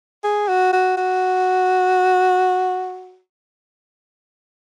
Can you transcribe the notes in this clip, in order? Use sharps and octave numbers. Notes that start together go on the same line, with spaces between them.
G#4
F#4
F#4
F#4